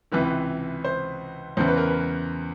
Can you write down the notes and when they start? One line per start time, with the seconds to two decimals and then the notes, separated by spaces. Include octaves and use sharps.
0.12 C#2 C3 E3 B4
0.84 C5
1.57 E2 C#3 E3 C5
1.68 B4
1.77 A#4
1.88 B4